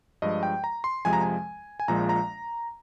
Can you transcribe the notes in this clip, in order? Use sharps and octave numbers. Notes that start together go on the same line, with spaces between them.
G2 F3 G#3 D#5
G5
A#5
C6
F2 C3 F3 G#3 G#5
A#5
G#5
G#5
A#1 A#2 F3 G#3 A#5
A#5